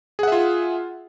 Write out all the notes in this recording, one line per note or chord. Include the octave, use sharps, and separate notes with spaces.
F4 G#4 E5 F#5